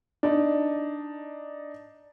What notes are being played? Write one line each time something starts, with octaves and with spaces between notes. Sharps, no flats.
D4 D#4